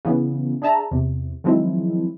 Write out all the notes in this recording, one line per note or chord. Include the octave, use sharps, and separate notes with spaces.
C#3 E3 B3 C#4
D4 G#4 E5 A5 A#5
E2 C3
D#3 F3 F#3 G#3 C4 E4